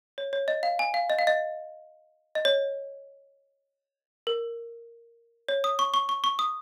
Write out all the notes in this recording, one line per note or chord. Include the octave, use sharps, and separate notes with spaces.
C#5
C#5
D#5
F5
G#5
F5
D#5
F5
D#5
D#5
C#5
A#4
C#5
D#6
C#6
C#6
C#6
C#6
D#6